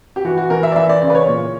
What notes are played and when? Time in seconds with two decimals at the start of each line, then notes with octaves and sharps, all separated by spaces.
0.16 G4
0.25 E3 F#4
0.38 F#4
0.50 E3 A#4
0.63 E5
0.72 D5
0.76 E3 E5
0.89 D5
1.02 C#3 D5
1.10 B4
1.15 C#5
1.28 A#2